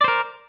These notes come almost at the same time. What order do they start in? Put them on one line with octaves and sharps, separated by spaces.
D5 C5 A#4